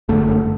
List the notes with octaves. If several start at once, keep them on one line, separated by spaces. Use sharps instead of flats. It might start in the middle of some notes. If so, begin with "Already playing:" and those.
G1 F#2 D3 A3